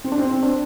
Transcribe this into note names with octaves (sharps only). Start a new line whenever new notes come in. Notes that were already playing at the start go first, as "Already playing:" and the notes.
C4
D4
C4
C4
D4